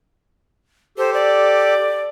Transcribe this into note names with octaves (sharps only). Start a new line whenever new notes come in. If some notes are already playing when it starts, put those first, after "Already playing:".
G4 A4 C5
D5